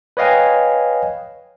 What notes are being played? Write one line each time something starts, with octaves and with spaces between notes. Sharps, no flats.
B4 C#5 D#5 F5 G5 G#5